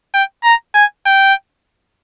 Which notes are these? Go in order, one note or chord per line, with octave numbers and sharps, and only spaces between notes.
G5
A#5
G#5
G5